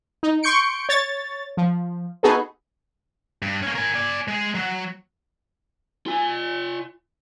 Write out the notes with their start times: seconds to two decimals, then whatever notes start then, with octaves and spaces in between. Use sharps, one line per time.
0.23 D#4
0.43 C6 C#6 G6 C#7 D7
0.89 C#5 A6
1.57 F3
2.23 B3 D#4 F#4 G#4 A4 B4
3.42 G2
3.63 A#3 C#4
3.75 A#4 G#5
3.94 D5 G#5
4.28 G#3 G#4
4.55 F#3 F#4
6.06 F4 G#5